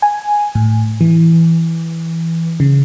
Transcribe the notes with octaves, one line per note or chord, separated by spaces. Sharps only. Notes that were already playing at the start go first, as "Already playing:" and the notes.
G#5
A2
E3
C#3